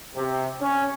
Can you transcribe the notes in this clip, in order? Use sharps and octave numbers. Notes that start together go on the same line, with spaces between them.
C3
C#4